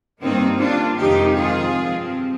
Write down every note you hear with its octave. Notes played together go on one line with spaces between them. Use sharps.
G2 D#3 A#3 C4 D#4
D4 F4
F2 C3 D#3 G#3 C4 D#4 G4
F4 G#4
G2 F3 C4